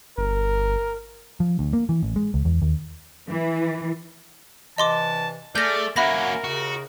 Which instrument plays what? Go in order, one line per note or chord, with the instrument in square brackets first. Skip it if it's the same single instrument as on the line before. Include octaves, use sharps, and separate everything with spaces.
[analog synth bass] G1 [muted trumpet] A#4
[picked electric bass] F3
D2
A#3
E3
A1
G#3
C#2
E2
D#2
[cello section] E3
[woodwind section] G2 C3 E3 [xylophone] D#5 C6 D6 [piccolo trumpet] A5
[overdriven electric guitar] A3 [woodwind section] G#4 F6 [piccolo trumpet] D5 [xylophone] G6 A#6
[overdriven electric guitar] A#3 C#4 [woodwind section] F#4 F#5 [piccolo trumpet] A#4 [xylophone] E5 B5 A#6
[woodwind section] D#2 C#3 [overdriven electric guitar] F#4